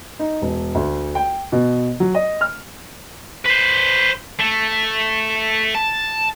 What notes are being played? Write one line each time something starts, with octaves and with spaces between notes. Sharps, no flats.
D#4
E1
D2
G5
B2
F#3
D#5
F6
B4 C5
A3
A5